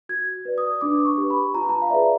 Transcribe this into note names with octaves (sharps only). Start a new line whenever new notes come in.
F#4 G#6
B4 D5
D#6
D4 D6
C#6
G4 B4
B5
F4 A#5
A5
A#5
F5
G#4 B4 D5 E5